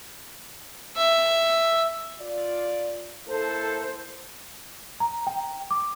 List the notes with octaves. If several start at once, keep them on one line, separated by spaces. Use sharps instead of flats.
E5
F4 D5
A#3 E4 A4 C5
A#5
G5
D6